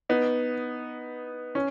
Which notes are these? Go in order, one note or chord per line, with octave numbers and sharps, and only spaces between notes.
B3 D#4
C#4